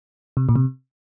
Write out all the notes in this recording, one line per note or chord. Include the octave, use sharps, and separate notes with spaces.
C3
A#2
C3